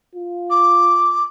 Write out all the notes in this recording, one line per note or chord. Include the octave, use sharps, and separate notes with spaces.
F4
D6